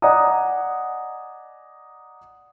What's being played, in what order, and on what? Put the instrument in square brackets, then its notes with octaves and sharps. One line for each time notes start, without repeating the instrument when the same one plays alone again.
[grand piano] D5 D#5 F#5 G#5 A#5 D#6